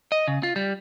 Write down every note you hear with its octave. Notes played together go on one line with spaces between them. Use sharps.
D#5
C#3
F4
G3